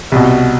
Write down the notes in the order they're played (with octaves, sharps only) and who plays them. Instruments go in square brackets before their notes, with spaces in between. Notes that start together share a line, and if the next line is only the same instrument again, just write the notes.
[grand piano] C2 B2